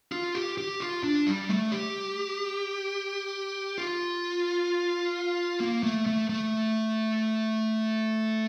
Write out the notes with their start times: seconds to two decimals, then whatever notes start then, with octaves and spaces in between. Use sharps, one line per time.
0.12 F4
0.35 G4
0.58 G4
0.80 F4
1.03 D4
1.26 G3
1.49 A3
1.72 G4
3.78 F4
5.60 A#3
5.83 A3
6.06 A3
6.29 A3